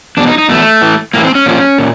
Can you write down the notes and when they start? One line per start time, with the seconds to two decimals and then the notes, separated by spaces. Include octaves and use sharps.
0.17 E2 D4
0.20 B2
0.28 D#4
0.38 D#4
0.49 E2 B2 A3
0.82 A2 E3
1.14 A2 E3 A#3
1.24 C4
1.35 C#4
1.46 A#2 F3
1.78 A#2